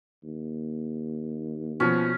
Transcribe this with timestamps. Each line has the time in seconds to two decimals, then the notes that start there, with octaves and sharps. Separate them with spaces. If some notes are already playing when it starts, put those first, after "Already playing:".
0.23 D#2
1.80 B2 F3 C#4